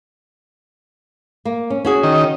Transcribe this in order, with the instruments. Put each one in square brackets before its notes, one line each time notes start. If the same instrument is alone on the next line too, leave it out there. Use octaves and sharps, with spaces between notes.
[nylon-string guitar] A#3
C#4
C#4 F#4 G#4
[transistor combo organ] D#3